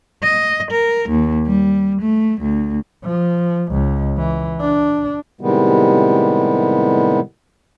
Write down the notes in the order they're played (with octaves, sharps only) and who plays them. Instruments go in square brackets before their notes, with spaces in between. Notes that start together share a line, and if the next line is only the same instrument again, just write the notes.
[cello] D#5
A#4
D#2
G3
A3
D2
[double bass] F3
C#2
E3
D4
[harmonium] A2 C3 D#3 G3 G#3 B3